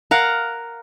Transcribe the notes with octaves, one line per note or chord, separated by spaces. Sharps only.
A#4 F5 F#5